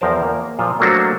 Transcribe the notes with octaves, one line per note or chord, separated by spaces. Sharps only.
E2 F3 A#4 C5 A5
A#3
A#2 F3 F4 C5
F#3 A3 A#3 D4 F#4 C5